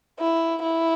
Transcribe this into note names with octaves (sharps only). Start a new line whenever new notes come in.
E4
E4